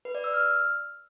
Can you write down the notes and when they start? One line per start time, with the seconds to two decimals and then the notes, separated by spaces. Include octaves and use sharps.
0.05 B4
0.15 D5
0.24 E6
0.34 F6